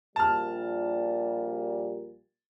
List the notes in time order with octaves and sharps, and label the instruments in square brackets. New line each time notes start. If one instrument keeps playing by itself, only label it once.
[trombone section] A#1 A#2 G3 [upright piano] A5 F6